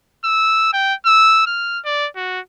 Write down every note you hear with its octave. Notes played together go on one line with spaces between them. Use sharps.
E6
G5
E6
F6
D5
F#4